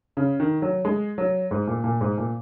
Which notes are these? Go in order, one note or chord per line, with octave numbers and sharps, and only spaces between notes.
C#3
D#3
F#3
G#3
F#3
G#2
A#2
A#2
G#2
A#2